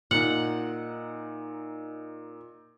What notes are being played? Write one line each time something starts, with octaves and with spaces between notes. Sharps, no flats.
A#2 D#4 F#5